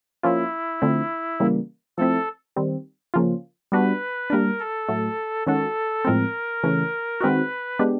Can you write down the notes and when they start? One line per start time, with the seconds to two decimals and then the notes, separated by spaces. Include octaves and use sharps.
0.23 F3 A#3 C#4 E4 F4
0.82 D3 F3 A3 C4
1.40 C#3 E3 G3 A#3
1.98 F3 A3 C4 E4 A4
2.56 D#3 G3 C4
3.14 C#3 F3 A#3 C#4 F4
3.72 G3 B3 D4 F#4 B4
4.30 G3 A#3 D4 A#4
4.60 A4
4.88 A2 F#3 A3
5.46 D#3 G#3 C#4 F#4 A4
6.05 A2 F3 G#3 C4 A#4
6.63 C#3 E3 A3 C#4
7.21 D#3 G#3 C4 D#4 F#4 B4
7.79 G#3 B3 D4 G4